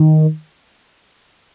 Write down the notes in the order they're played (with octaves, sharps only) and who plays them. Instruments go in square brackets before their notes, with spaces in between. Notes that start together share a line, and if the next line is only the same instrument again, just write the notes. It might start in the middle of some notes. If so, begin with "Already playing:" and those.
Already playing: [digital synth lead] D#3